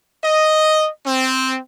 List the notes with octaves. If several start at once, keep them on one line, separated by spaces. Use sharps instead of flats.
D#5
C4